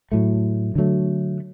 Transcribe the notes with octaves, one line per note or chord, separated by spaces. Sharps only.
A2 F#3 A3
D3 F#3 A3